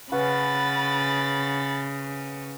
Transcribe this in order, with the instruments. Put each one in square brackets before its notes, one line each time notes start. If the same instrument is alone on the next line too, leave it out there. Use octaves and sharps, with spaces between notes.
[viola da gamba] C#3 [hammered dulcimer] C#4 B4 F#5 [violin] B5 A6